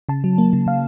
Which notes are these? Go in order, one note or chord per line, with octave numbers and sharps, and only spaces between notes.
C#3 A5
F#3
A#3
C#3
C#3 F5